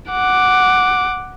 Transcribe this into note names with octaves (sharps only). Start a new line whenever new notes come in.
F#5 D6